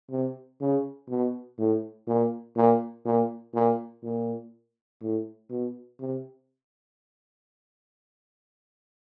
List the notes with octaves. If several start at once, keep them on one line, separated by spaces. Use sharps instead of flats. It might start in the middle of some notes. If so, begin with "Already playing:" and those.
C3
C#3
B2
A2
A#2
A#2
A#2
A#2
A#2
A2
B2
C3